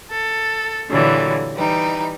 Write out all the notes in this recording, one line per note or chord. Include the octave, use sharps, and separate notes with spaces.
A4
A#2 D3 E3 F#3 G3
E3 G3 D#4